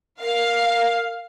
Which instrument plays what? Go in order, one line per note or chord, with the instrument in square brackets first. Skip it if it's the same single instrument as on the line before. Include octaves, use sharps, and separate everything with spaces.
[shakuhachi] A#4 [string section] F5